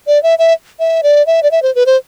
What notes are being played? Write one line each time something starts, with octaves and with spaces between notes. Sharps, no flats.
D5
E5
E5
E5
D5
E5
D5
E5
C5
B4
C5